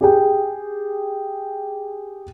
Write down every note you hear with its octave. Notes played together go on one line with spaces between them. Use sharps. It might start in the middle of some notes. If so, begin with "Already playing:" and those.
G4 G#4 G5